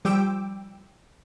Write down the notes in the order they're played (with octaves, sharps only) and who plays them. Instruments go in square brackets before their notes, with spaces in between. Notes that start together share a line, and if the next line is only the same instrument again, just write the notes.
[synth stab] F3 G3 G4 G5 D6 E6